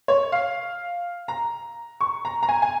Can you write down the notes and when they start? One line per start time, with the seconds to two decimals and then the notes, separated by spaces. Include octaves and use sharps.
0.08 C#5
0.32 F5
1.28 A#5
2.01 C#6
2.25 A#5
2.43 A#5
2.49 G#5
2.62 G#5